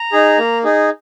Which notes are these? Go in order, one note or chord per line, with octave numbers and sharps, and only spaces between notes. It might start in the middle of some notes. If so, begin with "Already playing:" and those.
Already playing: A#5
D#4 G#4
A#3
D#4 G#4